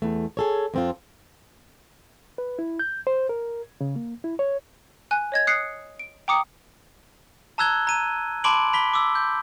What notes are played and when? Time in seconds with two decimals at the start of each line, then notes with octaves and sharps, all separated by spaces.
0.02 E2 A3
0.37 G#4 A4 C#5
0.74 F2 C4 F4
2.38 B4
2.59 E4
2.79 G6
3.07 C5
3.29 A#4
3.81 C#3
3.96 A#3
4.24 E4
4.39 C#5
5.11 G#5 F#6
5.32 C#5 D#5 G#6
5.47 D#6 F#6 C7 C#7
5.99 D7
6.28 G5 A#5 D6 D#6 C#7
7.58 A5 A#5 E6 F#6 G#6 G7
7.87 A#5 D#7
8.44 A5 B5 C6 D6 D7 F#7
8.73 B5 B6 G7
8.94 D6 E6
9.15 G6